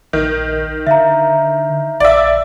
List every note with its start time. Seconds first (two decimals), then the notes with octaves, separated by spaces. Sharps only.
0.13 A#1 D#3
0.87 D3 E5 F5 A#5
2.00 A#1 D5 E5